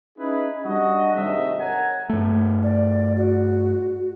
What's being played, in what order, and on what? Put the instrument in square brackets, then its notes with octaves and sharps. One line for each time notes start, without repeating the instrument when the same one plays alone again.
[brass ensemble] C#4 D#4 E4 G#4 B4
G3 D4 F#4 D#5
G#1 C3 A3 D#5 E5
A#4 C#5 F#5 G#5 A#5
[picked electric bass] G2 A3
[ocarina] D5
F#4